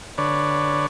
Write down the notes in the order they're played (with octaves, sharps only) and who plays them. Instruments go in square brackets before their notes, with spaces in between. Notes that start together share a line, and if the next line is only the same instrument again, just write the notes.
[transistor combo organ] D3 B4 C#5 D5